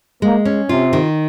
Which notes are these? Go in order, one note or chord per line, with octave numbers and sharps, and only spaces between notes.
G#3 A#3
C#4
C3 F4
D#3